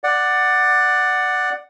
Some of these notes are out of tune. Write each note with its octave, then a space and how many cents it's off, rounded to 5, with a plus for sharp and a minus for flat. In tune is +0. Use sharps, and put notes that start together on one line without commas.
D5 +10 F#5 +0